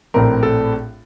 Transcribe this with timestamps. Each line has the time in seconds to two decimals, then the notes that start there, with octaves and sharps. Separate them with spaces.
0.14 A#1 A2 A3 C4 A#4
0.43 A4